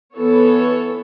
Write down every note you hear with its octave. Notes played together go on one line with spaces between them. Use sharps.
E3 B3 A4 C#5